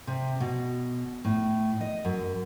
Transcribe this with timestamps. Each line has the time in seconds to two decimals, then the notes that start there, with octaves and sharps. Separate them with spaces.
0.07 C3
0.40 B2
1.25 A2
1.81 D#5
2.05 F#2